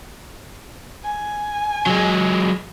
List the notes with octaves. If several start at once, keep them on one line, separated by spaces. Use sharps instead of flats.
G#5
F#3 G#3